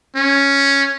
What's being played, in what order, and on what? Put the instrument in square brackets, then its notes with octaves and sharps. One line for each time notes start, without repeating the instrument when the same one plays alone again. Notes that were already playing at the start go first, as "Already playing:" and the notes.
[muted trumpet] C#4